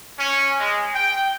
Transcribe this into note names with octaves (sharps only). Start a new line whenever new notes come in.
C#4
G#3
G5